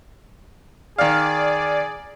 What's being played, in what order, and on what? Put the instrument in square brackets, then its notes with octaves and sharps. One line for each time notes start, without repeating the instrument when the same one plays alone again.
[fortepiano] D#3 F5 [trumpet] G#4 [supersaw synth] D5